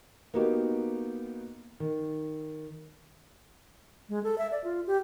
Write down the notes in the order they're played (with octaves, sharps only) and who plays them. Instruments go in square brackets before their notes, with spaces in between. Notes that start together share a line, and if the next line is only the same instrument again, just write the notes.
[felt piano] A#3 B3 D#4 F#4 G4
D#3
[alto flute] G#3
A4
E5
D5
F4
G4